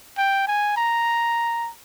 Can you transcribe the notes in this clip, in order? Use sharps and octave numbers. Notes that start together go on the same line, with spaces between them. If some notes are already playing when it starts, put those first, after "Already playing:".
G5
G#5
A#5